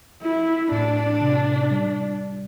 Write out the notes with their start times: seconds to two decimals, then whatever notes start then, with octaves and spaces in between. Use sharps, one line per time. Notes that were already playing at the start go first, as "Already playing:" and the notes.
0.22 E4
0.72 A2 D4
1.22 C3
1.71 G3